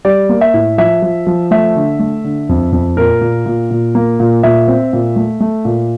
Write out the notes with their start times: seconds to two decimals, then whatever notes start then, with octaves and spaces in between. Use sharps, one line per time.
0.05 G3 D5
0.29 A#3
0.41 E5
0.54 A2
0.78 F3 E5
1.02 F3
1.27 F3
1.51 A3 E5
1.76 D3
1.99 A3
2.24 D3
2.49 F2
2.72 F2
2.97 A#2 A#4
3.21 A#2
3.46 A#2
3.71 A#2
3.95 A#3
4.20 A#2
4.43 A#2 E5
4.68 C4
4.93 A#2
5.16 A3
5.40 A3
5.65 A#2